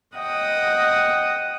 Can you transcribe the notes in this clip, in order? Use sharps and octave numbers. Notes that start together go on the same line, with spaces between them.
D#5 F#5 G5 D#6